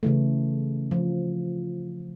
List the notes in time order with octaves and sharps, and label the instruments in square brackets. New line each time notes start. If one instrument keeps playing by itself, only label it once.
[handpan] C#3 E3 A3
F3